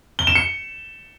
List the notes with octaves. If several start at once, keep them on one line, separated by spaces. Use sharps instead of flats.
G7
E7
C#7